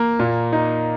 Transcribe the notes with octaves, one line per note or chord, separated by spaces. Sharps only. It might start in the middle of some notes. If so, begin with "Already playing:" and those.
Already playing: A#3
A#2
D#4